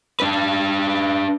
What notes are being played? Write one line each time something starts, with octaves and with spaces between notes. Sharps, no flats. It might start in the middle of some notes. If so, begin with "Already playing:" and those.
D4 B4